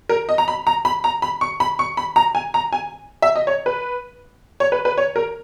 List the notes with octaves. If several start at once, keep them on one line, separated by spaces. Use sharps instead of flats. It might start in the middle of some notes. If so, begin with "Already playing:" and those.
A#4
D#5
A#5
B5
A#5
B5
A#5
B5
C#6
B5
C#6
B5
A#5
G#5
A#5
G#5
E5
D#5
C#5
B4
C#5
B4
B4
C#5
A#4